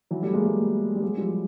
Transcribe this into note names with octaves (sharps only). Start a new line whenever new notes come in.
E3 F#3
G3 A3
G#3 A#3
G3 A3
G3
F#3 G#3
F3 G3